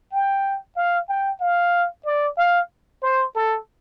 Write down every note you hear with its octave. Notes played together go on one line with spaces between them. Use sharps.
G5
F5
G5
F5
D5
F5
C5
A4